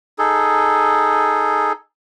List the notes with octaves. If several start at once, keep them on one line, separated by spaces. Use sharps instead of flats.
D#4 G#4 A4